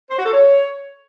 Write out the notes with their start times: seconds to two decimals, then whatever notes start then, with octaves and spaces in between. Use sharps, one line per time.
0.11 C5
0.18 F#4
0.26 A4
0.33 C#5